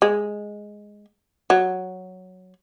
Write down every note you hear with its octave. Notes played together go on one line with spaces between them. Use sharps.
G#3
F#3